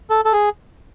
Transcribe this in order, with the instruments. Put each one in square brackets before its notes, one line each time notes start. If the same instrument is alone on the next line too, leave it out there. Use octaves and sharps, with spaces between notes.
[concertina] A4
A4
G#4